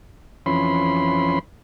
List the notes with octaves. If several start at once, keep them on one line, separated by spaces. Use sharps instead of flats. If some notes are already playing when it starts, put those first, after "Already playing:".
F2 E3 C#4 B5 C6